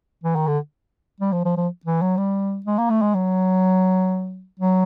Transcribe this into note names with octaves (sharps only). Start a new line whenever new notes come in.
E3
D#3
D3
G3
F3
F3
F3
E3
F#3
G3
G#3
A#3
A3
G#3
F#3
F#3